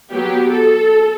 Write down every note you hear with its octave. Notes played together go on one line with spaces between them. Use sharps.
F#3 B3 G4
A4